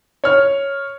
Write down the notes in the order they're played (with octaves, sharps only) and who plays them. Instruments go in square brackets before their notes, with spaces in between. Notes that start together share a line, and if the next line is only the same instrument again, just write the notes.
[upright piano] C#5 F6